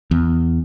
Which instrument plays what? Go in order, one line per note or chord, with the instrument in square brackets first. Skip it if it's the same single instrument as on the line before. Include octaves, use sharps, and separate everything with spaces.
[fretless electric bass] E2